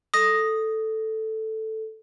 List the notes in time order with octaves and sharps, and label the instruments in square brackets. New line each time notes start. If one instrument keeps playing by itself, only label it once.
[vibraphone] A4 [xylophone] D#6 A#6